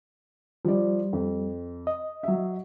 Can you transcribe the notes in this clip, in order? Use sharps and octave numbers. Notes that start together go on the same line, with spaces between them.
F3 G3 D5
F2
D#5
F#3 E5